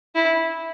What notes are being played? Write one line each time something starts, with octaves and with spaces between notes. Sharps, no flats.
E4